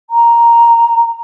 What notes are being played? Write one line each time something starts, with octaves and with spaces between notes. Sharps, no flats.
A#5